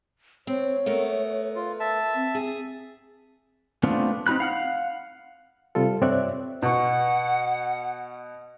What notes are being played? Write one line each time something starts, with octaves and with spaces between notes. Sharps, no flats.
C4 C#5
A3 B3 A#4
F4
E5 A5
C4
G#4
A3 B3 C4 D4 F4
C4 D#4 F4 B5 F#6
F5 F#5 F6
C3 G3 F4 A4
G2 C4 C#5 D5 E5 F#6
B2 F#5 C#6